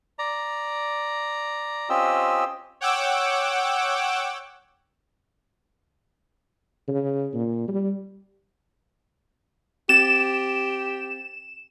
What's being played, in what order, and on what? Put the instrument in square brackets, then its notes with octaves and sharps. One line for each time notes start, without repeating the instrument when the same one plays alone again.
[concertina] D5 A#5
C4 C#4 F4 G4 D#5 E6
[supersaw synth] C#5 F#5 G5 D6 E6
[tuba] C#3
A#2
G3
[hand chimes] C4 A6 [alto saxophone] G4 [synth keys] E7